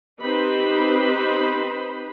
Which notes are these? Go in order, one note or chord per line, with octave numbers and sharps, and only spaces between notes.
C4 D#4 G4 B4 C5 B5